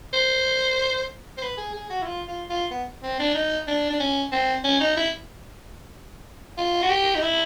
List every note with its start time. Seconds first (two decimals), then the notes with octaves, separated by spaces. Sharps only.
0.13 C5
1.37 C5
1.42 B4
1.57 G#4
1.74 G#4
1.90 F#4
2.02 E4
2.06 F4
2.28 F4
2.50 F4
2.71 B3
3.03 C4
3.19 D4
3.35 D#4
3.67 D4
3.90 D4
4.00 C#4
4.32 C4
4.64 C#4
4.80 D#4
4.96 E4
6.58 F4
6.82 F#4
6.90 G4
7.15 D#4
7.22 E4